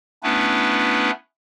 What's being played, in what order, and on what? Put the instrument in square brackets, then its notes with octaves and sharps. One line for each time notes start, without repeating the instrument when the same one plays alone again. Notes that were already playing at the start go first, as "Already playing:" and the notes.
[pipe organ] A3 B3 C#4 D4 E4 B4